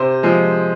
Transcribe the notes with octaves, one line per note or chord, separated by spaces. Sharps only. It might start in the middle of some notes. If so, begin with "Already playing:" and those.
Already playing: C3 C5
F3 G#3